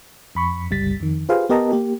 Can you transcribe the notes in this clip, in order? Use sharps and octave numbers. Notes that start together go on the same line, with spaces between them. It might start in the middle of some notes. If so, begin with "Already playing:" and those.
F2 B5 C#6
G1 C#2 G3 A6 B6
F2 D#3
F4 G4 G#4 B4 C5 F5
B3 G4 A#4 D#5 A5 A#5
A#3 G4